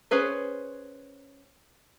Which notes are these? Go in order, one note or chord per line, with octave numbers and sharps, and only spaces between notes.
C#4 G#4 B4 C5